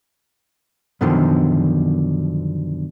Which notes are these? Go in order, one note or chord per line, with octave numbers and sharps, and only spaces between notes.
F#2 B2 D3 D#3 F3